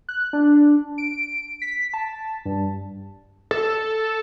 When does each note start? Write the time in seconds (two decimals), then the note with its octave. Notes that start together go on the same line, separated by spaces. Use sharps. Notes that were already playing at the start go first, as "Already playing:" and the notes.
0.09 F#6
0.33 D4
0.98 D7
1.62 B6
1.94 A5
2.45 G2
3.51 A4